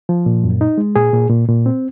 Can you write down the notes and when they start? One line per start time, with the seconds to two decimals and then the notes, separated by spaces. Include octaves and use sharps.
0.09 F3
0.26 A#2
0.44 F#2
0.61 D#4
0.78 G#3
0.95 A#2 G#4
1.13 A#2
1.30 A#2
1.48 A#2
1.66 C4